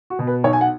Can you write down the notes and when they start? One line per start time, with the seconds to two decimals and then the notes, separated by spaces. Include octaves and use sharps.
0.10 F#4
0.19 B2
0.27 B4
0.44 B1 C#5
0.53 G#5
0.61 F#5